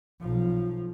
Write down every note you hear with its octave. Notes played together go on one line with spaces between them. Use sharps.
B1 F3